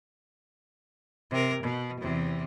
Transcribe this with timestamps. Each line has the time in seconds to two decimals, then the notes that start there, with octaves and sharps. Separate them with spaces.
1.31 C3 A#4
1.63 B2
2.00 E2 C3